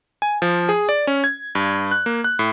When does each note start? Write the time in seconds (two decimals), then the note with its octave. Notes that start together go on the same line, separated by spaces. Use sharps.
0.22 G#5
0.42 F3
0.69 G#4
0.89 D5
1.07 C#4
1.24 G#6
1.55 G2
1.91 F#6
2.06 A#3
2.24 F#6
2.39 A2